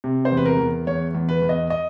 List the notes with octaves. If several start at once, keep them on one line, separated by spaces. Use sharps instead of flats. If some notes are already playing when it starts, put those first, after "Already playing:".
C3
C5
E2
B4
A#4
E2
E2 C#5
E2
B4
E2
D#5
D#5